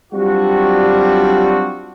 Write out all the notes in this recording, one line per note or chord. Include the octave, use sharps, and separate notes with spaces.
F#3 G3 C4 D4 F4 F#4